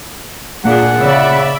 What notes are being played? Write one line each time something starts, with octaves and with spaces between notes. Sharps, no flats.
A#2 D4 G#4 F#5
C#3 D5 E5 B5